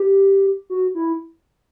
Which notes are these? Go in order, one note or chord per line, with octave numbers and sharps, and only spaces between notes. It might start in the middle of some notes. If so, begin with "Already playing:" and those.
Already playing: G4
F#4
E4